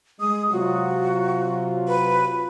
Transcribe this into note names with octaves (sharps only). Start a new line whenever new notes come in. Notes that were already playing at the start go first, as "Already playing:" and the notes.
G#3 D#6
C3 F#3 F4 F#4
B4